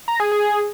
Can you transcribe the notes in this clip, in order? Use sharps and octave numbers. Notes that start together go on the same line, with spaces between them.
A#5
G#4
G#4